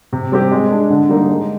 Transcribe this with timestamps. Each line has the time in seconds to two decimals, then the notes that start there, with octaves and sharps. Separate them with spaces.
0.13 C3
0.32 G3 C4 G4
0.51 G#3
0.71 D4 G#4
0.90 D3
1.09 G3 A#3 D#4
1.29 G#3